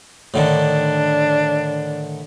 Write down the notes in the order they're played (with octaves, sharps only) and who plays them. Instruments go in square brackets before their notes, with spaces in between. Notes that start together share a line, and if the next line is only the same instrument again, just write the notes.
[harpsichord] A2 D3 D#3 [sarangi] D4